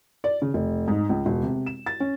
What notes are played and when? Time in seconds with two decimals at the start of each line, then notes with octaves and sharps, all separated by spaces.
0.24 D5
0.42 C#3
0.54 F1
0.88 G#2
1.09 C#2
1.26 E1
1.43 C3
1.66 E7
1.86 A6
2.00 C#4